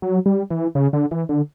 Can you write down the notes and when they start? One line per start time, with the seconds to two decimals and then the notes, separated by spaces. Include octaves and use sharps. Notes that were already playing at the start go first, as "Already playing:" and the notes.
0.02 F#3
0.26 G3
0.51 E3
0.75 C#3
0.93 D3
1.11 E3
1.29 D3